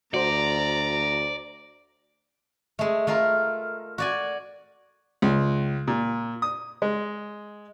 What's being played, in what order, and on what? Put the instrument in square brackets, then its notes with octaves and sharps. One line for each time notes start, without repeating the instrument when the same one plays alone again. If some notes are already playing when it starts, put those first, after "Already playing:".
[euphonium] D2 [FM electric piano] F#4 C5 [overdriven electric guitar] D5 [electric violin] A#5
[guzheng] G#3 A3
A3 F4 A#4
F#4 D5 G#5
[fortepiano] C#2
A#2
D#6
G#3